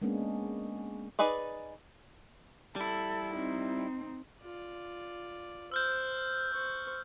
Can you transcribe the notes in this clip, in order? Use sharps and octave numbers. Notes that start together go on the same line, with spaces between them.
G#3 A#3 B3 C#4 D4
D#4 G#4 B4 D5
G3 E4 A4
C4 D#4
F4 D5
C5 E6 F6 G6
C5 C#6